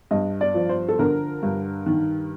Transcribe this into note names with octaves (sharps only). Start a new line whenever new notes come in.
G2 D#5
D5
F3
C5
A4
D3 A#4
G2
D#3